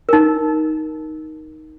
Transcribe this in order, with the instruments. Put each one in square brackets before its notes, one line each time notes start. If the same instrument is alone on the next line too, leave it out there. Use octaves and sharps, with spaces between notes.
[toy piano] D#4 A#4